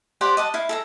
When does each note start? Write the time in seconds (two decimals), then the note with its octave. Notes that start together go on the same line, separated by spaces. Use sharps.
0.21 G4 C5 D5 F#5
0.37 D#5 F#5 A5
0.54 E4 F5
0.69 A4 E5 A#5